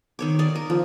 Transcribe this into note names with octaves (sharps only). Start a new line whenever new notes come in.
D#3 C#5 D6
D5 D#5 F5
A#4
F3